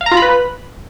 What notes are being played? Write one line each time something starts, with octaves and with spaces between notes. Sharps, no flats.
F5
A#5
F4
B5
B4